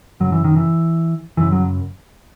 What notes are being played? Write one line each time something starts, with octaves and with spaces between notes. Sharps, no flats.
F#2 C#3 F#3
E3
D#3
E3
F#2 C#3 E3
F#3